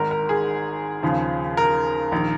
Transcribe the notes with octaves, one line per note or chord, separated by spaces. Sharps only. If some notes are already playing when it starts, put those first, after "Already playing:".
Already playing: G#1 G#2 D#3 A#4
A#4
G#4
D#2 C#3 F3
A#4
A#1 D#3